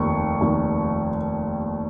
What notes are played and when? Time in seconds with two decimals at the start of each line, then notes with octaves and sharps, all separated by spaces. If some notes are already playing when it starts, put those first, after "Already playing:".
Already playing: F1 D#2 D#3 C#6
0.41 F1 D#2 D#3